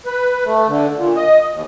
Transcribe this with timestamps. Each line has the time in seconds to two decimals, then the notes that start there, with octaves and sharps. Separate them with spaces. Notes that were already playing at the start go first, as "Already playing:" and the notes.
0.06 B4
0.45 A3
0.68 D3
0.97 A#2
1.16 D#5
1.53 D#2